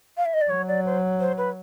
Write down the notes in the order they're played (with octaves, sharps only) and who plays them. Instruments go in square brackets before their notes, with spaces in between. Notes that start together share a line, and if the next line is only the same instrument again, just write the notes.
[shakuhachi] F5
E5
D#5
D5
[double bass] F#3 [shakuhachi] C#5
[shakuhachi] D5
C5
C5
B4